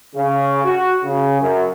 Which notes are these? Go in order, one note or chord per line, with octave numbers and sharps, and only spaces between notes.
C#3
F#4
C#3
F#2